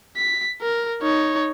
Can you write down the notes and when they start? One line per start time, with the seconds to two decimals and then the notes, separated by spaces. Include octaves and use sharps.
0.17 B6
0.62 A#4
1.02 D#4 C#5